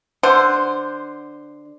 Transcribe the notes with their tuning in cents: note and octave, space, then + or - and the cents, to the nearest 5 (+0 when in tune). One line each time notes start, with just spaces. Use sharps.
D3 +10 C5 +0